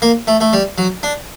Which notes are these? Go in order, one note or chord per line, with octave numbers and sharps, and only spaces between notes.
A#3
A3
A3
G3
F#3
D4